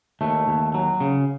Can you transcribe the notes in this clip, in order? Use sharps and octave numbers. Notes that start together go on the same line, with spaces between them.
D#2 A3
D#2
F#3
C#3